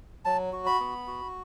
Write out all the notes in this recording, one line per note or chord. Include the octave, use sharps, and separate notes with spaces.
F#3 A5
F#4
B5
B3
F#4